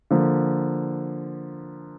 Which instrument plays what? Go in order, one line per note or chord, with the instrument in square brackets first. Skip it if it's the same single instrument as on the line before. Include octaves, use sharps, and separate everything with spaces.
[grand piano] D3 F3 A#3